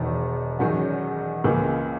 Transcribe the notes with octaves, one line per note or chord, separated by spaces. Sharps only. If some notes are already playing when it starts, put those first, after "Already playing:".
Already playing: E1 E2 D#3
E2 D#3 F#3 C#4 F#4
C#2 C#3 E3 A#3